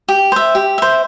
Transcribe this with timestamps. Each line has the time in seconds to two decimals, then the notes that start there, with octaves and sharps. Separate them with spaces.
0.09 G4
0.32 C5 E5
0.55 G4
0.78 C5 E5